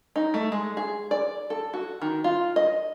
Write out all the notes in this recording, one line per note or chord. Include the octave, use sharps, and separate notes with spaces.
D#4
A3
G#3
G#4
D5
A4
F#4
D#3
F4
D#5